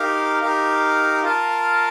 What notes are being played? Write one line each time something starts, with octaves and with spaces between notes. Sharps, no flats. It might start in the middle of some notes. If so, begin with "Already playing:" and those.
Already playing: D#4 G4 A#4 F5
D#4 G4 A#4 F5
F4 A#4 F5 A5